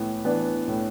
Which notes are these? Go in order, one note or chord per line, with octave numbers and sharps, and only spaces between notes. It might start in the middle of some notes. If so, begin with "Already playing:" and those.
Already playing: A2 E3 B3
E3 B3 D4
A2